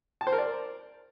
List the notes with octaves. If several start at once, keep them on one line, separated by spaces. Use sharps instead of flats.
A5
C5
A#4
D5